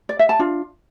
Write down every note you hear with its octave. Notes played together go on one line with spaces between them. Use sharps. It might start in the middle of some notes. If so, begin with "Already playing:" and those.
D5
E5
A5
D4 F4